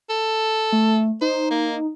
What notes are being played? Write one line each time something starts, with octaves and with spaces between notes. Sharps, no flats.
A4
A3
D#4 C5
A#3